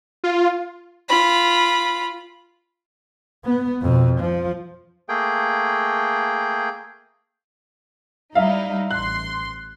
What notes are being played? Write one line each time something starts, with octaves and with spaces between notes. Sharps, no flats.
F4
F4 B5
B3
F2 B2
F3
A3 A#3 G#4 G5
G3 D#4 E4 E5 F5
A1 C6 F#6